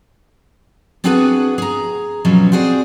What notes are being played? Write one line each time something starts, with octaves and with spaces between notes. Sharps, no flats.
B3 C4 D4 F#4 G#4 B4
G#4 A#5
B2 F3 F#3 C#4
C4 F#4 G#4 C5 D5